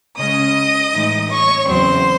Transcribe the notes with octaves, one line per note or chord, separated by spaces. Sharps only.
C#3 G#3 C#4 D#5 D#6
A2 E3 G#3 D#4
C#5 C#6
E2 C#3 F#3 C4 C5 C6